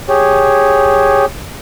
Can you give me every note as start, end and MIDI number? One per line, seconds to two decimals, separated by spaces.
0.09 1.25 67
0.09 1.25 68
0.09 1.25 73